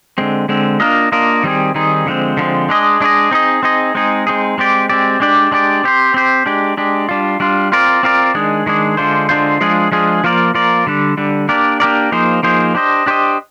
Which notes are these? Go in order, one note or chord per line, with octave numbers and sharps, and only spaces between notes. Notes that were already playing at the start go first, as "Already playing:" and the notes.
D3 G#3 C4
D3 G#3 C4
A#3 D4 F4 A#4 D#5
A#3 D4 F4 A#4 D#5
D#3 G3 C4 D#4 G#4
D#3 G3 C4 D#4 G#4
D3 F3 G#3 C4
D3 F3 G#3 C4
G#3 D4 G#4 D#5
G#3 D4 G#4 D#5
C4 D#4 G#4 D#5
C4 D#4 G#4 D#5
G#3 C4 D#4 G#4
G#3 C4 D#4 G#4
G#3 C4 G4 D5
G#3 C4 G4 D5
G#3 D4 G4 D5
G#3 D4 G4 D5
C4 G4 C5
C4 G4 C5
G#3 D4 G4
G#3 D4 G4
G3 D4 F4
G3 D4 F4
C4 F4 A#4 D5
C4 F4 A#4 D5
D#3 G#3 D4 G#4
D#3 G#3 D4 G#4
D3 G#3 D4 F4 C5
D3 G#3 D4 F4 C5
F3 G#3 D4 F4 G#4
F3 G#3 D4 F4 G#4
F3 A#3 F4 A#4 D5
F3 A#3 F4 A#4 D5
D3 G3 D4
D3 G3 D4
A#3 D4 G4 A#4 D5
A#3 D4 G4 A#4 D5
F3 A#3 D#4 G#4 C5
F3 A#3 D#4 G#4 C5
D4 G4 C5 D#5
D4 G4 C5 D#5